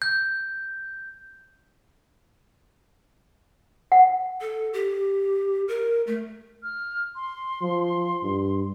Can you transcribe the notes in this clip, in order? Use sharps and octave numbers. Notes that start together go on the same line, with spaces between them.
G6
F#5
A4
G4
A#4
A3
F6
C6
F3
G2